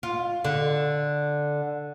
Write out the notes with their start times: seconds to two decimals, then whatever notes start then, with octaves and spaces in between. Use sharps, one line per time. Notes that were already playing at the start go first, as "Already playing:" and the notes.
0.03 F4
0.44 D3